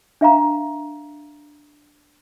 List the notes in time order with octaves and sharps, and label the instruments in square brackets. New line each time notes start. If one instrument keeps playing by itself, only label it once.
[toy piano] D4 E5 F5 A#5